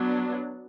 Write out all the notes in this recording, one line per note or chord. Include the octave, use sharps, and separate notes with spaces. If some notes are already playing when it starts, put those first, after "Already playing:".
Already playing: F#3 B3 D4